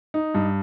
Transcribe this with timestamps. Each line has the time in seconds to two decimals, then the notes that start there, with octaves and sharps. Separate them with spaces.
0.14 D#4
0.34 G2